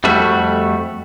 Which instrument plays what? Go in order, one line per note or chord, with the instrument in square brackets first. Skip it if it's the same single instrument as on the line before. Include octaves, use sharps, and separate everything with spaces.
[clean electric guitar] F2 G3 A3 F#4